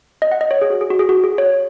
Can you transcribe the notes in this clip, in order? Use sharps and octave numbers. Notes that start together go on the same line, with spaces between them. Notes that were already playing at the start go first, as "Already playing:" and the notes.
D#5
F#5
D#5
C#5
G#4
F#4
G#4
F#4
G#4
F#4
G#4
C#5